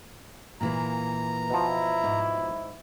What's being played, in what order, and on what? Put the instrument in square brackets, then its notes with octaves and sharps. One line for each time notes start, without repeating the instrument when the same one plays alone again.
[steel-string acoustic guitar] A#2 E3 A#3 [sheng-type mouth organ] A#5
[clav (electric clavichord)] B2 F3 [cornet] E4
[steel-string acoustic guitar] G#2